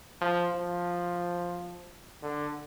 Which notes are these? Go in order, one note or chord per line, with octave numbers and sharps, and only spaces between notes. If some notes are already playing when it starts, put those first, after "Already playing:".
F3
F3
D3